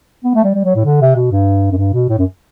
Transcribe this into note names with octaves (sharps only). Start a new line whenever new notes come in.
B3
A3
G3
G3
F#3
A2
D3
C3
B2
G2
F#2
G2
B2
A2
F#2